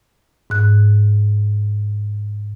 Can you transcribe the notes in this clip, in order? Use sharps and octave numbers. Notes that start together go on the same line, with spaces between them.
G#2 F#6